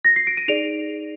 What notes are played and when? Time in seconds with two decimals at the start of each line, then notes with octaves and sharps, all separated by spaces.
0.05 A#6
0.16 C7
0.27 D7
0.37 D#7
0.48 D#4 G#4 D5 D7 F7